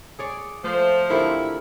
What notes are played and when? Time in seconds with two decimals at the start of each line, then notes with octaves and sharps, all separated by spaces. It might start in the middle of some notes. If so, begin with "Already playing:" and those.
0.19 G#4 C#5 D5
0.64 F3 A3 C5
1.10 D3 C4 E4 F4 G4 A#4 C#5